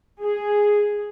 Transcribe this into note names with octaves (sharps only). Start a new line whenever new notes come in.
G#4